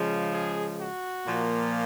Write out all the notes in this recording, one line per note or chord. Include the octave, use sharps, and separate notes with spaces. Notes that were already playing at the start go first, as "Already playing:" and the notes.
Already playing: C#3 F3 G#3
G#4
F#4
A#2 F3 A#3